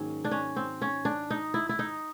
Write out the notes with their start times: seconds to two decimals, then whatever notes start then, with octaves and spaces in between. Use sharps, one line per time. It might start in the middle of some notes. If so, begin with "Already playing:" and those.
Already playing: G#2 D#3 F#3 A#3 C#4
0.24 D4
0.31 C#4
0.56 C4
0.82 C#4
1.05 D4
1.30 D#4
1.54 E4
1.69 E4
1.79 D#4